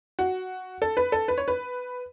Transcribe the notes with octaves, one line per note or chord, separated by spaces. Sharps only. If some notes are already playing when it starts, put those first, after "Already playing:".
F#4
A4
B4
A4
B4
C#5
B4